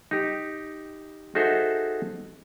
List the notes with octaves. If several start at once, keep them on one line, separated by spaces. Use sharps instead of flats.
D#4 G4
D#4 F#4 G#4 A4 C5 E5